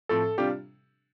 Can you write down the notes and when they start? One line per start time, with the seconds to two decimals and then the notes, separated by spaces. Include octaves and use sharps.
0.09 A2 F3 C4 A4
0.38 C3 G3 D4 F4 G4